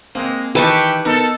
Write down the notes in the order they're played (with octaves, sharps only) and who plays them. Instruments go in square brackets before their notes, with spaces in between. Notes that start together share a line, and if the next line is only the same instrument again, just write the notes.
[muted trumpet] G#3 [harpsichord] A#3 [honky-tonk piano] C4
[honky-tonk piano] D#3 E3 [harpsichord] D#4 E4 [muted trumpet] G4 [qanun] B4 A5 C#6
[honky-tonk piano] B3 A#4 [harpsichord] D#4 [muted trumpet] A4